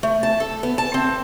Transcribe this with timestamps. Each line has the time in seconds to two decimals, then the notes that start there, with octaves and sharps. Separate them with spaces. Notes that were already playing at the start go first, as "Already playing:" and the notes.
0.03 A3
0.23 A5
0.40 A4
0.63 B3
0.78 A5
0.94 C4